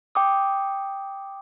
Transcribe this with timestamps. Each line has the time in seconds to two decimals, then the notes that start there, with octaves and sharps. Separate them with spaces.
0.15 G5 D6 D#6